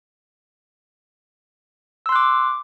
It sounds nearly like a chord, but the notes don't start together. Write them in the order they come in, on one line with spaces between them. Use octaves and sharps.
E6 C6 F#6 D6